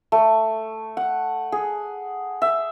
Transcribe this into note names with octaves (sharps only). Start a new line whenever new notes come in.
A3
F#5
G#4
E5